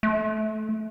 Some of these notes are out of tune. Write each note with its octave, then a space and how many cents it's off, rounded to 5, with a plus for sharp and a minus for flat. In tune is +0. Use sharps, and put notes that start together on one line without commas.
A3 -20